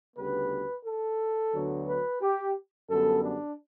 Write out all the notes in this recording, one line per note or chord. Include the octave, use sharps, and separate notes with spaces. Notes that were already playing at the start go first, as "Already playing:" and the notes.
D2 C#3 G3 B3 B4
A4
D2 D3 F#3 B3
B4
G4
F#2 D3 G3 B3 A4
D4